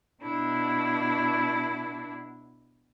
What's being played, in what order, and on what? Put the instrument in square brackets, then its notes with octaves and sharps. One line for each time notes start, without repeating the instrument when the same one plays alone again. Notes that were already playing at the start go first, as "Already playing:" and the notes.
[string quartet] B2 D4 E4